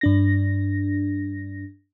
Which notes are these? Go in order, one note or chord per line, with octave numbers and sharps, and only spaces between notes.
G2 D4 A#6